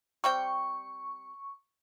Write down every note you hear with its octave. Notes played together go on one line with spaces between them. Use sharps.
G3 C4 G5 C#6